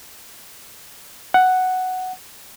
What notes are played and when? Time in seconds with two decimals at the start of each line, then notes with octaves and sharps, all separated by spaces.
1.34 F#5